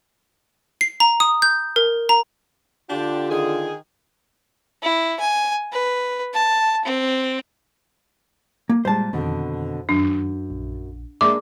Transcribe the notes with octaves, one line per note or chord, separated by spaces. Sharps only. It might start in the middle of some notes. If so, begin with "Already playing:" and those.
C7
A#5
D#6
G6
A#4
A#5
D3 D4 F4 G4
D#3 G#4
E4
G#5
B4
A5
C4
A#3
A#2 G3 G#3 C5 A5
F2 B2 D3 D#3 C4
F#2 D4
A#1
G#3 A#3 D4 E5 C6 D6 E6